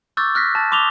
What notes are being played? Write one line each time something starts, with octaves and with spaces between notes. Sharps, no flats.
C#6 D6 E6 F#6 G6 A6
F6 F#6 A#6 B6
A5 A6
C6 D6 D#6 F7 G7